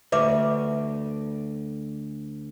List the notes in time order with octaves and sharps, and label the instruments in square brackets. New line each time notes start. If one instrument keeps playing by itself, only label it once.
[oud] D2 [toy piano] B4 E5 D6